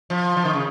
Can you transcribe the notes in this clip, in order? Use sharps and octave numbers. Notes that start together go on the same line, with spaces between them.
F3
F3
D#3
C#3